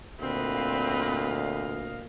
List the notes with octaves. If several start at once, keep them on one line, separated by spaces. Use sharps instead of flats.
D2 A#2 C4 B4 D#5 F5